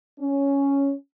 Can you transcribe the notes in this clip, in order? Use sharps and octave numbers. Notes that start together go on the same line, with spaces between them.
C#4